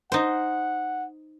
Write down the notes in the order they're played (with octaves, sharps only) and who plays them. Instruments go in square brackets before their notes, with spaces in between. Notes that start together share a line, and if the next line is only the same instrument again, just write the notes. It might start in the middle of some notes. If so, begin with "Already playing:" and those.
[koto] D#4 C5 [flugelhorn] F#5